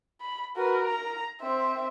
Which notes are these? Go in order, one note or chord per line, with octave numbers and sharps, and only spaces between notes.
B5
F#4 A#4 B4
A#5
C4 C5 E5